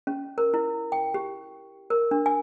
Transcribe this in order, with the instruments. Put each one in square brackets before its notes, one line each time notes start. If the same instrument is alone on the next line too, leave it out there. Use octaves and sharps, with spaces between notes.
[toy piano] C#4
A#4
E4
G5
G4
A#4
D4
G#5